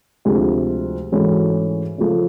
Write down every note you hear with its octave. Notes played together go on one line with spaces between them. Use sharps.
D2 C3 F3 G#3
G#2 E3 A3 C#4 F#4
C#3 F3 A3